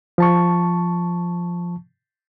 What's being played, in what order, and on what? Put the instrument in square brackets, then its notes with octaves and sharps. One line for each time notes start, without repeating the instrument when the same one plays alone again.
[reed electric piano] F3 A5 C#6